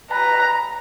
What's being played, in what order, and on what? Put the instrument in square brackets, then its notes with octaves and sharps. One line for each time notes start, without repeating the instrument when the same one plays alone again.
[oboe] B4 [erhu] A#5